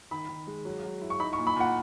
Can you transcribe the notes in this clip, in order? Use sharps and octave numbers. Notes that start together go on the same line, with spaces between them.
D#3 B5
D#3
G#3
F#3
F#3
E4
C#6
D#4 B5
C#6
A#2
B5
A#2 F#5